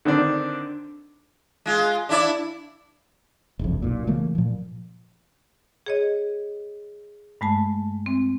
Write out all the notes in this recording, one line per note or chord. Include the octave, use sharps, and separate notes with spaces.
D3 D#3 C4 D4
G#3 F4
D4 E4 D5
E1 C2 F2
B1 A#2
C#3 E3 A3 A#3
A#2 F3
G#4 C#5 D#5
G2 G#3 A3 A5
C4